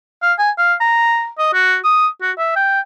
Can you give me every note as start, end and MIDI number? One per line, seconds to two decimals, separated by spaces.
0.22 0.34 77
0.39 0.51 80
0.58 0.74 77
0.81 1.29 82
1.38 1.49 75
1.54 1.77 66
1.84 2.08 87
2.22 2.32 66
2.38 2.55 76
2.56 2.80 79